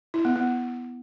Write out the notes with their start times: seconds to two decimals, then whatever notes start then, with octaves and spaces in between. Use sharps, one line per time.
0.14 E4
0.25 B3
0.36 B3